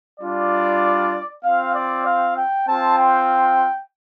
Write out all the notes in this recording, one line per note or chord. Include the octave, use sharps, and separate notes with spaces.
G3 D4 F4 D5
C4 F4 F5
D5
F5
G5
C4 F4 A5
G5